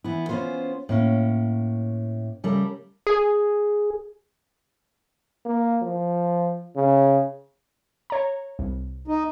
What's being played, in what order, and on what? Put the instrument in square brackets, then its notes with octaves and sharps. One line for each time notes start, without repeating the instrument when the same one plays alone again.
[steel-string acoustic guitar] E3 B3 E4
B3 C#4 F4 F#4 C5
A2 A#3 C#4
C#3 G3 A3 A4 A#4
[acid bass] G#4
[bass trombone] A#3
F3
C#3
[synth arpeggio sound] C#5 A#5
C2
[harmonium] D#4